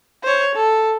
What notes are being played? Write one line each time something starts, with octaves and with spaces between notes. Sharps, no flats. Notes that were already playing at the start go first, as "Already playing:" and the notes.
C5 C#5
A4